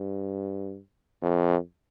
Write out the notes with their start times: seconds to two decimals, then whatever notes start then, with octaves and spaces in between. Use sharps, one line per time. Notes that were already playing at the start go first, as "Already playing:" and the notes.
Already playing: G2
1.22 F2